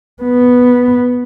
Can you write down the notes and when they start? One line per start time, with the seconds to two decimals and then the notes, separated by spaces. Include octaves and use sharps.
0.23 B3